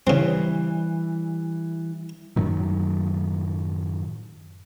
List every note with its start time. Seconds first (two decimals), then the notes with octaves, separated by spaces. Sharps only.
0.07 C#3 E3 G3 C4 E4
2.36 F#2 A2 D#3 F#3